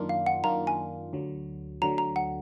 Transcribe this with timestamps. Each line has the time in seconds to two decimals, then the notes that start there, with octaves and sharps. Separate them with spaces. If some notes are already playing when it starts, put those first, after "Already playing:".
Already playing: F#2 D#3 A#3 D4 F4
0.09 F5
0.26 F#5
0.44 F#2 D#3 A#3 D4 F4 A#5
0.67 G#5
1.13 D2 D3 F#3
1.82 D2 D3 F#3 A#5
1.98 A#5
2.16 F#5